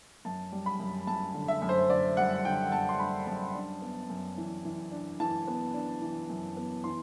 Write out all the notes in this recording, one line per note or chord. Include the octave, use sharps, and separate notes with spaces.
F#2 A5
G3
B5
F#2
F#2 A5
D3
E5
F#2
C5
D3 D5
G3 F#5
D3 G5
F#2 A5
C6
G3 B5
F#2 A5
D4
B3
F#2
E3
E3
D4
E3 A5
B3
D4
E3
F#2
B3
E3 C6